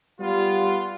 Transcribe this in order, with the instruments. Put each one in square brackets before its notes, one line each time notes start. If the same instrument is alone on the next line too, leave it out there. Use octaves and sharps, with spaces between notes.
[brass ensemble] G3 B3 F4